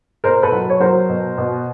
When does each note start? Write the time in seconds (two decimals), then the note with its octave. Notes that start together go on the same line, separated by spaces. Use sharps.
0.24 B2 A#4 C5
0.43 A4 B4
0.52 F#3
0.70 C#5
0.80 F#3 A#4 C5
1.09 B2
1.38 B2